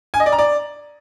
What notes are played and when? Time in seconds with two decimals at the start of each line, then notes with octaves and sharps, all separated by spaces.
0.14 G#5
0.20 D#5
0.26 D5
0.32 A#5
0.39 D5